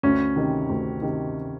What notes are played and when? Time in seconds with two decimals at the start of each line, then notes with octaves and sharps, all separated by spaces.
0.03 D2 C#4
0.36 C3 D#3
0.69 D2
1.02 C3 D#3